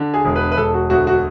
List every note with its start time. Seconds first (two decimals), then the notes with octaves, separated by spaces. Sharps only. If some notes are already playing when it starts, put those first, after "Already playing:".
Already playing: D3
0.14 G#4
0.25 E1
0.36 B4
0.52 B4
0.57 E1 A4
0.74 F#4
0.90 D2 F#4
1.07 F#4